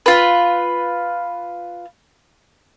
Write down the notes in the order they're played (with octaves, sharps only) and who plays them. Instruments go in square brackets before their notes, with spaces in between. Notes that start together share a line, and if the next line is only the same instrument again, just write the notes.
[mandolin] F4 B4